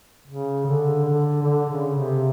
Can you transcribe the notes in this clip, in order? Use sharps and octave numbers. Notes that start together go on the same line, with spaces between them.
C#3
D3
D3
D3
C#3
C3